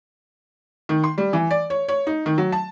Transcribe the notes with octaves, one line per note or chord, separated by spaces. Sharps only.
D#3
C6
G3
E3
D5
C#5
C#5
D#4
D#3
F#3
A5